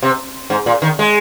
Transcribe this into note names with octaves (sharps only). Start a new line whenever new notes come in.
C3
G#2
A#2
D#3
G#3